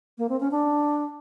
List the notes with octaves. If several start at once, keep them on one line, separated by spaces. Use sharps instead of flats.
A#3
C4
C#4
D4